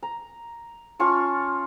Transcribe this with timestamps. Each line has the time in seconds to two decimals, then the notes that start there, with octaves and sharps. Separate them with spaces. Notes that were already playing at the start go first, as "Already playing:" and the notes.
0.03 A#5
0.99 C#4 F4 A5 C#6